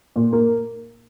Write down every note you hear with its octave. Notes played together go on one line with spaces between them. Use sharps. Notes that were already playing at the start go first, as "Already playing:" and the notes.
A#2
A#3